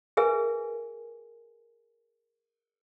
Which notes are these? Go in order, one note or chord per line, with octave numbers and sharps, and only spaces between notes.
G#4 A#4 B4 E5 G#5